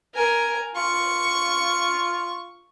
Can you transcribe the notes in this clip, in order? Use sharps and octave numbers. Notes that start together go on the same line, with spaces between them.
A#4 G#5
F4 C#6